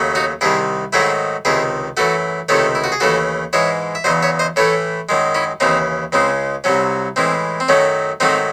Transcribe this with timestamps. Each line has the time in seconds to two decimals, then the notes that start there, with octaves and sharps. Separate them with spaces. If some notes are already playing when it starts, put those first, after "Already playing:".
Already playing: D#2 C#3 F#3 A3
0.15 D#4 F#4
0.41 C2 C3 D#3 E4 G#4
0.93 G#2 D#3 F#3 A3 E4 G#4
1.45 C#2 C3 D#3 E4 G#4
1.97 F#2 E3 A3 F#4 A4
2.49 C#2 C3 D#3 A3 A4 C#5
2.75 E4
2.84 F#4
2.92 G#4
3.00 D#2 C#3 E3 A3 F#4 A4
3.53 G#2 E3 G#3 C#5 E5
3.95 E5
4.04 E2 C#3 F#3 C5 D#5
4.22 C#5 E5
4.39 C5 D#5
4.56 A2 E3 A3 A4 C#5
5.09 F#2 D#3 G#3
5.35 C#4 E4
5.60 D#2 C#3 E3 C4 D#4
6.12 C#2 C#3 G#3 C4
6.64 C2 C3 F#3 C#4
7.16 A2 E3 G#3 C4
7.60 C4
7.68 F#2 D#3 F#3 A3 C#4
8.20 G#2 D#3 F#3 A3 C4 D#4